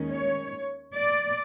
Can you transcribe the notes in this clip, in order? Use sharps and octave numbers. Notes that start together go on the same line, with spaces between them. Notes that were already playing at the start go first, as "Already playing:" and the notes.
Already playing: D#2 D#3 G#3 C#4
C#5
D5